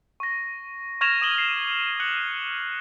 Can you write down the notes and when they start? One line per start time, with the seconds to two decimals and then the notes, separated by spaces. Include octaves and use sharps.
0.20 C#6 A#6
1.01 C#6 F6 G#6 A#6 E7 F7
1.21 D6 D#6 D#7 E7 F#7 G7
1.36 A#6 C7
2.00 F#6 C#7 F#7